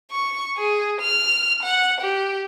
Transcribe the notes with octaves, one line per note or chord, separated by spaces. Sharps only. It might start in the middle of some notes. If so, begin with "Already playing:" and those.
C#6
G#4
F6
F#5
G4